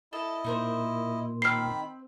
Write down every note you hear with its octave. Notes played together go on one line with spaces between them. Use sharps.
E4 A4 D#5
A#2 D#4 A#4 C5
D#3 C4 B5 F6 C7